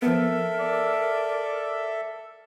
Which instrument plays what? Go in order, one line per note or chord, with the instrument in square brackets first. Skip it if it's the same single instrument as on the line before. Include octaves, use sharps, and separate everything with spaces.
[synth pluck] F3 B3 [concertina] A4 E5 [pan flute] A#4
[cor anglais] D5